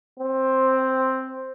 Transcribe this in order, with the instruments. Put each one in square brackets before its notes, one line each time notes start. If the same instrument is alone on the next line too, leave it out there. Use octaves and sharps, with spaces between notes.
[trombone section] C4